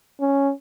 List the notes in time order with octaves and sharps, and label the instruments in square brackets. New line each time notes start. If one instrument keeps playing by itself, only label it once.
[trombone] C#4